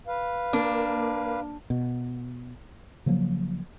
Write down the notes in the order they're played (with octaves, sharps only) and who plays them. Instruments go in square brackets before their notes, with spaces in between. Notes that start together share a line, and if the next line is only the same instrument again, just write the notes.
[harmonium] B4 F5
[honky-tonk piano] A#3 [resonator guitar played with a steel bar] D4
[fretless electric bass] B2
C#3 F3 F#3 A#3